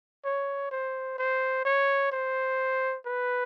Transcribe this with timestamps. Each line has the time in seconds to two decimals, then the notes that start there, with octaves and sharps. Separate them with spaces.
0.25 C#5
0.71 C5
1.18 C5
1.65 C#5
2.12 C5
3.06 B4